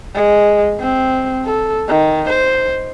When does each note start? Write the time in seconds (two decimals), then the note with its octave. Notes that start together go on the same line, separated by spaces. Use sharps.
0.14 G#3
0.80 C4
1.45 A4
1.88 D#3
2.29 C5